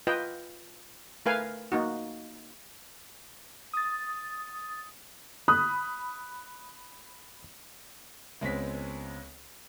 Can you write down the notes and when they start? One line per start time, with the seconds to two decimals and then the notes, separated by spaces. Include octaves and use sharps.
0.07 F4 B4 D#5 G5
1.26 A3 A#4 B4 F5 G#5
1.72 A#3 D#4 F#4
3.73 D#6 A6
5.48 B5 D#6 F#6
8.41 C#2 G#3 B3 C4 C#5 B6